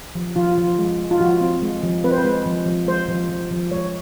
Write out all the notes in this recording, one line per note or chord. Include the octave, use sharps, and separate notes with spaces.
F3
F3 F4
F3
G#3
G#3
F4
F3 F#4
C4
G#3
F3
C4 B4
C5
B4
G#3
F3
F3
G#3 C5
F3
F3
F3
G#3 C#5